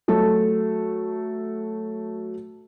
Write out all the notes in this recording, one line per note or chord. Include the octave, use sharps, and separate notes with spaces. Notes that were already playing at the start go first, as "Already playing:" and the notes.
F#3 A3 A4